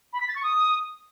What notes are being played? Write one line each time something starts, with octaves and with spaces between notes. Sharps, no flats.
B5
B6
A6
C#6
D#6